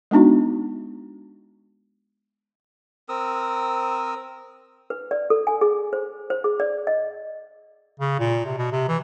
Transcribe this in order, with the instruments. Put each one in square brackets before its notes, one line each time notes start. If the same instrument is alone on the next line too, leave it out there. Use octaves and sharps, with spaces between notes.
[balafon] G#3 B3 D4 D#4 F#4
[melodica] C4 A#4 D#6 E6
[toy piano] B4
D5
A4
G#5
G#4
C5
C5
G#4
D5
D#5
[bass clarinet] C#3
A#2
C3
B2
C3
E3